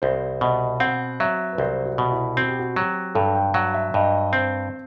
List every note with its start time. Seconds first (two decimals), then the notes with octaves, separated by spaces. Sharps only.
0.02 C2 C5
0.41 B2 D#5
0.80 C4 F#5
1.20 F#3 E5
1.53 B4
1.58 C2 C5
1.85 F#4
1.98 B2
2.12 E4
2.37 C4 F#4
2.48 G4
2.59 F#4
2.76 F#3 G4
3.15 G2 A4
3.35 G5
3.54 F#3 F#5
3.74 E5
3.94 G2 D#5
4.33 C4 C5